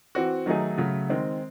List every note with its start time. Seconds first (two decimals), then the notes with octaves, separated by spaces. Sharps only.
0.15 E3 C4 F#4
0.46 D#3 F#3 A3 D#4 G#4
0.78 C#3 F#3 A3
1.09 D#3 G#3 C4